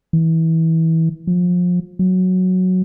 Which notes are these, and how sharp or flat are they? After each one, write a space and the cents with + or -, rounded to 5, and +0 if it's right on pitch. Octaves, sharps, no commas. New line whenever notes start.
E3 -25
F3 +30
F#3 -5